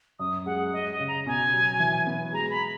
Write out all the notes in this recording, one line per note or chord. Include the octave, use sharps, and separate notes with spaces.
F#2 D#6
G#3 F#5
G#3 D#5
D#5
C#3
A#5
B2 G#5
F#3
E3
B3
G#3 A#5
B5